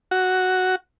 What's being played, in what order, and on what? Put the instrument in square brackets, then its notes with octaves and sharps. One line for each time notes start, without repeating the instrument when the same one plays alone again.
[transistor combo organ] F#4